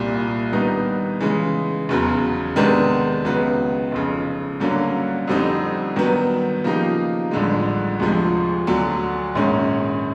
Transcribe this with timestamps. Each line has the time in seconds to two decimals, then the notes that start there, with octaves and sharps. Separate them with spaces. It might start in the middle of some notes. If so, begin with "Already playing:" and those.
Already playing: C2 A#2 G3
0.52 G2 D#3 G3 B3 D#4
1.20 C#3 E3 G#3
1.89 F1 E2 C#3 F#3
2.56 C3 D#3 G#3 B3 D4
3.24 C#2 C#3 F#3 B3
3.92 F1 F2 C#3
4.60 G2 D3 F#3 A#3 C#4
5.27 F2 D3 G3 C4 D#4
5.96 G2 D#3 F#3 B3
6.64 C#3 F3 A#3 D#4 G4
7.31 A1 G2 D3 F3 G#3
8.00 D2 C3 F3 G#3
8.67 D2 D3 F#3
9.35 A#1 G#2 D#3 G#3 C#4